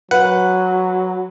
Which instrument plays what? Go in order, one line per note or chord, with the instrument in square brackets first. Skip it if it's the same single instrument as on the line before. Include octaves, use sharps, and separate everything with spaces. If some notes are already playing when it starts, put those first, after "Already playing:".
[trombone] F#3 [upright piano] B4 [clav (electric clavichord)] F#5